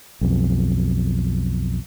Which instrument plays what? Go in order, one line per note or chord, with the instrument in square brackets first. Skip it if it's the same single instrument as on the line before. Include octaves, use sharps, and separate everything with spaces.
[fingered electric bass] B1 F2